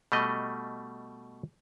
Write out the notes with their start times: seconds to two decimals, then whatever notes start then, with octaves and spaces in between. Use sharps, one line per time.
0.12 B2 G3 A3 D#5